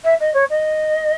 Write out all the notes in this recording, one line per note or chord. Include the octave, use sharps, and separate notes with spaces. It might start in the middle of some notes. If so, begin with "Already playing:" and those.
E5
D#5
C#5
D#5